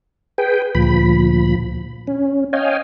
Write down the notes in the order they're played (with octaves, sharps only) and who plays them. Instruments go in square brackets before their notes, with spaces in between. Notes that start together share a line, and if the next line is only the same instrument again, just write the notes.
[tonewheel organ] G#4 B4 G5
D2 A#2 F3 B5
C#4
C#5 D#5 F5 G5 G#5